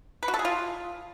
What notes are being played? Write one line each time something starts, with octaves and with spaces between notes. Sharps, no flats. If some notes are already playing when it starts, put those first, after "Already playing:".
B4
F#4
A4
G#4
F4